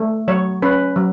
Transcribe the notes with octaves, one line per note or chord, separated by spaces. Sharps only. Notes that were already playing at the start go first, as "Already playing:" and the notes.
Already playing: A3
F#3 C#5
C#4 B4
F#3